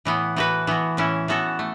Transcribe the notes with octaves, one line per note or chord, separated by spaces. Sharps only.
A2 E3 B3
E3 A3 F#4 B4
E3 B3 F#4
A2 E3 C#4 E4
E3 B3 F#4 A4
A3